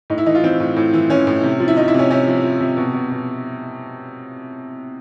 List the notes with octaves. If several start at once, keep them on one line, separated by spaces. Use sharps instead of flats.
A2 D#4
E4
E3 D#4
F4
E3 C4
A2
A2
E3
E3 C#4
A2
C3
F3
E4
F3 D#4
E4
C3 C#4
C3 C#4
F3
F3
C3
B2
B2
B2